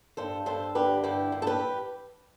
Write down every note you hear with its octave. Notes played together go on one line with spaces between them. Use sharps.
G2 A4 C5
G2 A4 C5
D3 G4 B4
G2 E4 G4
G2
A4
G4 B4